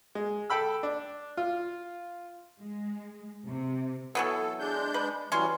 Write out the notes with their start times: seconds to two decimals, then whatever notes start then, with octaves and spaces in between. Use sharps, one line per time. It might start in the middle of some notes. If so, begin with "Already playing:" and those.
0.15 G#3
0.50 A4 G5 B5 E6
0.83 D4
1.37 F4
2.60 G#3
3.47 C3
4.15 E3 F#3 B3 A4
4.60 G#3 D4 G6
4.94 B4
5.32 E3 F#3 G3 C#4 C6